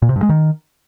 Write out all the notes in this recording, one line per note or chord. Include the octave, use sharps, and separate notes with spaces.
A#2
C3
G2
G#3
D#3